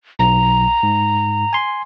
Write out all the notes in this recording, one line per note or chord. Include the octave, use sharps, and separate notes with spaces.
B1 A#5
G#2
G#5 C6